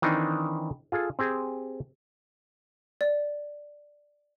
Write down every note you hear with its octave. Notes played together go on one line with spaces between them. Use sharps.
D#3 E3 C4 D4 D#4
F4 G#4 A4
C4 G4 G#4
D5